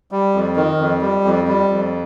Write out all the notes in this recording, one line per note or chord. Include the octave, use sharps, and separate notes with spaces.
G3
F2
D#3
F2
G3
F2
G3
F2